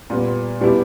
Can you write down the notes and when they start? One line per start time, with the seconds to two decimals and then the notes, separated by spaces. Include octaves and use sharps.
0.10 A#2 G3 B3
0.61 B2 G3 B3 E4 G4